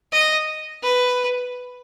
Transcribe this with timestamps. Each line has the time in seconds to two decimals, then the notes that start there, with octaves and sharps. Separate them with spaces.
0.12 D#5
0.83 B4